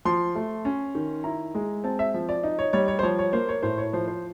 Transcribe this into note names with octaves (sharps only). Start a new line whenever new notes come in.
F3 C6
A3
C#4
D#3
E4 A#5
G#3
C4 A5
E5
F3
D5
D#4
C#5
G3 C#5
C#5
C5
F3 C#5
C#5
A#3 C5
C#5
A2 C5
C#5
F3 C5
C5